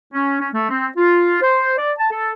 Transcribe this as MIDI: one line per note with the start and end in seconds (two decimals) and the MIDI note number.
0.13 0.37 61
0.40 0.49 61
0.54 0.69 57
0.70 0.88 60
0.97 1.39 65
1.42 1.72 72
1.78 1.91 74
1.98 2.07 81
2.11 2.32 69